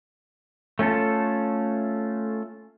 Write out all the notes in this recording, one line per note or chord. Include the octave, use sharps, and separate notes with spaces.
A3 C#4 F4 A4